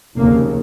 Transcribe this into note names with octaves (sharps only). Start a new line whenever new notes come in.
F1 D#2 C#3 A#3